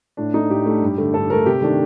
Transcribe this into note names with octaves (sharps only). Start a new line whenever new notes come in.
A2 D4
A3 D4 D#4
A2 G4
A3 D4
G2
D3 A3
G2 A4
D3 A3 A#4
C3 G4
D#3 A3 D4